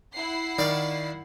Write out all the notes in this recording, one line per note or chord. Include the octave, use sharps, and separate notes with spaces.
E4 F#5 C7
D#3 D5 F5